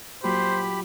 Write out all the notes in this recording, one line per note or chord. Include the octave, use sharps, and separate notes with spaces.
A#2 F#3 F4 G4 C5 B5